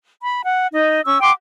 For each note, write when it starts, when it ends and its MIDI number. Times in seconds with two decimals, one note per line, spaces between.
0.23 0.41 83
0.43 0.67 78
0.72 1.01 63
0.72 1.01 75
1.05 1.20 61
1.05 1.20 85
1.05 1.20 88
1.21 1.31 78
1.21 1.31 79
1.21 1.31 84
1.21 1.31 86